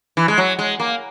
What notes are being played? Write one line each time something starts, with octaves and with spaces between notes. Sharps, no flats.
E3
G#3
F#3
G#3
A#3